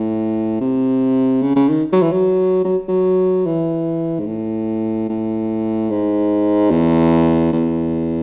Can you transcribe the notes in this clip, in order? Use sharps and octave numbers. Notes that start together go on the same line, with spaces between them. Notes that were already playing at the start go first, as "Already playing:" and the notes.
Already playing: A2
C3
C#3
C#3
D#3
F#3
E3
F#3
F#3
F#3
E3
G#2
A2
A2
G#2
E2
E2